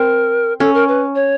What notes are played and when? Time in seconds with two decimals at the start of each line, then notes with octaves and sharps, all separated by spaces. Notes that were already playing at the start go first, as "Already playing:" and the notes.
Already playing: C4 A#4
0.60 C#4 A4
0.74 A#4
0.88 B4
1.15 C#5